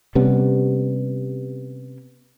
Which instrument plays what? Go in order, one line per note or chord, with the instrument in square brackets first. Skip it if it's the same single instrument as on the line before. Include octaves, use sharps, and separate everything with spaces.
[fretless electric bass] C3 G3 B3 C#4